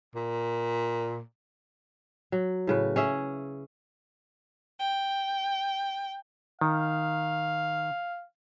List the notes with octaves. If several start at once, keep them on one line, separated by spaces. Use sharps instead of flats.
A#2
F#3
A2 C#3 B4
C#4 G#4 E5
G5
D#3 F5